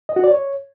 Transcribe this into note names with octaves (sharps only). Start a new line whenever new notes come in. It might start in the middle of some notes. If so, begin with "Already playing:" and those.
D#5
F#4
D5
C#5